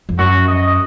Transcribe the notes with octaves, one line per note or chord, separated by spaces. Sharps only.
F2
F#2 F#4
D#5